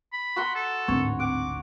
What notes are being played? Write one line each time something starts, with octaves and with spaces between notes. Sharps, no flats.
B5
F#4 F#5 C6
A4
D1 G#1 C#5
F#5 D6